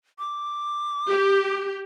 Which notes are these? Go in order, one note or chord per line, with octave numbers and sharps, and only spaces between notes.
D6
G4